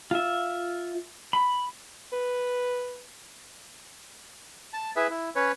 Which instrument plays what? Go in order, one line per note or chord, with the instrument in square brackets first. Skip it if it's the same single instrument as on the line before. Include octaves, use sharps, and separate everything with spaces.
[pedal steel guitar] F4 E5
B5
[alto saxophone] B4
[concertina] A5
E4 G#4 B4 E5
E4
C#4 B4 C#5